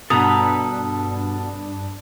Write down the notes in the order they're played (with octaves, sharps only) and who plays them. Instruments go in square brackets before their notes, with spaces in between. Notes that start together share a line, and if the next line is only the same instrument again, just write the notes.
[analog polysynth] G2 D4 [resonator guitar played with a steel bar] B2 B3 A#5 [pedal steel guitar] A4 B4 [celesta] D#6